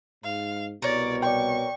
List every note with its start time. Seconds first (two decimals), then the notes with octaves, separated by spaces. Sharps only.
0.24 G#2 F5
0.82 C2 B2 A#4 C#5 D5
1.23 D5 G5 C#6